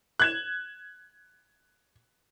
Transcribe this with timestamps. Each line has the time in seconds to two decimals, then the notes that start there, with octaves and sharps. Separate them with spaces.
0.20 F#6 G#6 E7